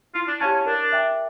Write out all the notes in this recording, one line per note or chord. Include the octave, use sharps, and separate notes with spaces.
E4 F4
D4
C#4 G4 C#5 F5 A5
C#4
D4 A#4
E5 G5 D6